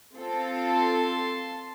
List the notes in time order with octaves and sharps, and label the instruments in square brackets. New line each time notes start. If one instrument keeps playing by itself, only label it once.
[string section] C4 F4 A4
[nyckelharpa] A5 C6